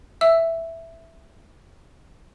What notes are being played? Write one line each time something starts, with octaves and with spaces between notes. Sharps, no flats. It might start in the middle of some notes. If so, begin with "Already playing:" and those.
E5 E6